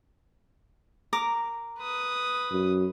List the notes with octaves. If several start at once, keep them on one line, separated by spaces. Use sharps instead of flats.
A#4 A#5 D6
B4 D#6
F#2